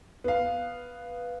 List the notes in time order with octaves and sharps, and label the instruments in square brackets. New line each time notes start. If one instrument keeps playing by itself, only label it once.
[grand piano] B3 F5